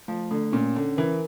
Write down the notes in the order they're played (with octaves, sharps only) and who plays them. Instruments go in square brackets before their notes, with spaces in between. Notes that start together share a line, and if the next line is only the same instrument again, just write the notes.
[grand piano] F3 [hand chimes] A3
[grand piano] D3 [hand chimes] A3
[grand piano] A#2 [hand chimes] C#4
[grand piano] D3 [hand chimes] C#4
[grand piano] E3 [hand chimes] A#4